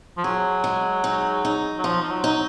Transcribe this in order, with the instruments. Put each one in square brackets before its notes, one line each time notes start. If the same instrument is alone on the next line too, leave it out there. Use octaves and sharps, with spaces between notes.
[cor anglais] F3
[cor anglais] F#3 [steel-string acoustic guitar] G#4
[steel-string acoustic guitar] G#3
D#4
D#4
[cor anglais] F#3
[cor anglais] F3 [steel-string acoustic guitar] D#4
[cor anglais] F3
F#3
[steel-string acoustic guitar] D#4